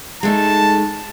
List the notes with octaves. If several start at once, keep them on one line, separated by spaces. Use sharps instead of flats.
G#3 A3 D#4 A5